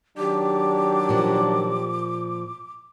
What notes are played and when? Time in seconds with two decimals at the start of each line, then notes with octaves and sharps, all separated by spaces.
0.18 D#3 F#3 D4 G4 D6
1.09 A#2 F3